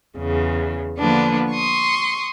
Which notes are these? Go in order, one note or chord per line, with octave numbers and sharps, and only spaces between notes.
E2 C#3
D3 F3 A#3 B3 D4
C6 C#6 D#6